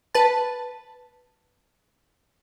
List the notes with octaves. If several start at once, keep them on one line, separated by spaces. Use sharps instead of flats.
B4 A5